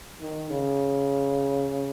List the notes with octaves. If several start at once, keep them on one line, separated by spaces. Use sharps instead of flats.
D#3
C#3